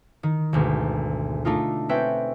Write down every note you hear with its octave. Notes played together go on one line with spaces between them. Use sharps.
D#3
G#1 D2 B2
A3 D4 D#4 F4
C4 C#4 B4 E5 G5